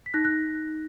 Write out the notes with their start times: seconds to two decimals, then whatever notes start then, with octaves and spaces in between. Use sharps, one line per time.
0.06 B6
0.14 D#4 F#6 A#6
0.24 F#6 A#6